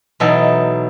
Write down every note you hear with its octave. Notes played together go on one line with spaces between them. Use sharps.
B2 E3 F#3 D#4 A4